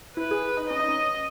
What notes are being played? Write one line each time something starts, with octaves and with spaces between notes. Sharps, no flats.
E4 B4
G#4
D#4
C#4 D#5
D#4
C#4